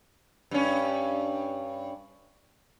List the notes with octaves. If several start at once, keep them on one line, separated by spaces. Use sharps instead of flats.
G2 C#4